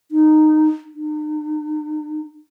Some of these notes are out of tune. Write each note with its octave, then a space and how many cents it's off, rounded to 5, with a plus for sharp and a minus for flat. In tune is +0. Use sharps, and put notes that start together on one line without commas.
D#4 -10
D#4 -45